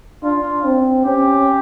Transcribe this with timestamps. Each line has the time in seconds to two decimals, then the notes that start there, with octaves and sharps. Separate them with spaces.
0.23 D4 F4
0.65 C4
1.05 C#4 G4